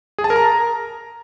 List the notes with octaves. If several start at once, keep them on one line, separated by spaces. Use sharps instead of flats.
G#4
A5
A#4
A#5